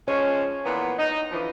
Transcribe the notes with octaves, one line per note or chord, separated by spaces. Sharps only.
F3 G#3 C#4 C#5
A#2 E3 B3
D#4
D3 E3 F3